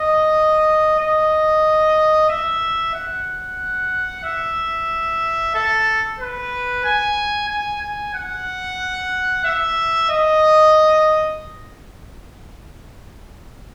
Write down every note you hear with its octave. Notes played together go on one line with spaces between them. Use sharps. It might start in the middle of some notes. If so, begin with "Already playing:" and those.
Already playing: D#5
D#5
E5
F#5
E5
A4
B4
G#5
G#5
G#5
F#5
E5
D#5